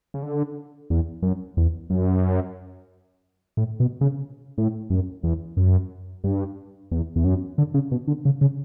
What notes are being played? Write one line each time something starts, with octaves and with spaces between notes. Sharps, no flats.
C#3
D3
E2
F#2
E2
F#2
A2
B2
C#3
A2
F#2
E2
F#2
G2
E2
E2
F#2
D3
C#3
B2
D3
C#3
C#3